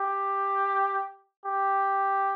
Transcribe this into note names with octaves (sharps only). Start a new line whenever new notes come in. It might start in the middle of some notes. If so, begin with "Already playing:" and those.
Already playing: G4
G4